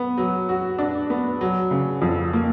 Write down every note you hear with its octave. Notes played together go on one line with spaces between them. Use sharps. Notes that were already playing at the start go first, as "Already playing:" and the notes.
Already playing: B3
F#3
F#4
D4
B3
F#3
C#3
F2
A#3